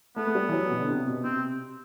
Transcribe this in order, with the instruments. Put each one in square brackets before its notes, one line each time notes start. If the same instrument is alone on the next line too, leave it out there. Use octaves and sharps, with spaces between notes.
[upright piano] A3 [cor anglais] B3
[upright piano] A3
G3
E3
F#3
B2
D3
C3
B2
[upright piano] C3 [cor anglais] C4